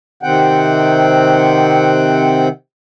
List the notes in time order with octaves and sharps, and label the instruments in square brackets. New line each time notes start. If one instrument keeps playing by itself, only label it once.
[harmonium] C3 D#3 C4 F#5 G5